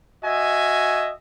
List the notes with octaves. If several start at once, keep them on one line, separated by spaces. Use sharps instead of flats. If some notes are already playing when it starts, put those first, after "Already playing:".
F#4 D#5 E5 G#5